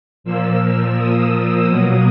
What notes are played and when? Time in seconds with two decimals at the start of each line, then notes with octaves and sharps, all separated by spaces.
0.24 A#2 F3 A#3 E6
0.96 D#6
1.67 B2 F#3 A#3